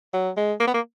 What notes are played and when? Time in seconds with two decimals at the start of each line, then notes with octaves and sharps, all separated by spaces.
0.13 F#3
0.37 G#3
0.60 A#3
0.67 B3
0.74 A#3